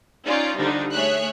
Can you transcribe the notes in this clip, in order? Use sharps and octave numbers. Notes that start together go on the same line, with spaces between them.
C#4 D#4 F4 D5
D3 F3 G3 D4 D#4
A3 G#4 C#5 E5 F#6